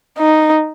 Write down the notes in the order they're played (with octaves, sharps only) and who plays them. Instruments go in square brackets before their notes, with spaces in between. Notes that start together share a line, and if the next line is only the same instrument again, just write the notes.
[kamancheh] D#4